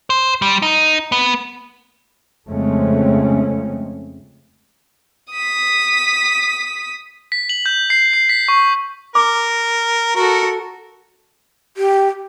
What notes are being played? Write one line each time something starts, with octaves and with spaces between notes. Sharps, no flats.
C5
G3
D#4
B3
F2 C#3 G#3 A3 C4 C#4
D#6 B6
B6
F#7
G6
C7
C7
B6
C#6
A#4 D6
F#4 A4 A#4
G4